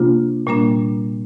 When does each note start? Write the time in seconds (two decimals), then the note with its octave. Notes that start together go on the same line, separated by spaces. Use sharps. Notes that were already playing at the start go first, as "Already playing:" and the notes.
Already playing: C3 A#3 D4 F4
0.47 A#2 G3 A#3 D4